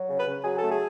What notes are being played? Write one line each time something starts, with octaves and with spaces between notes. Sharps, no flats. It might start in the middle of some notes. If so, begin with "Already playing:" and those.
Already playing: F#3
C#3
B4
C#3
F#3 G#4
A3 A4
G#4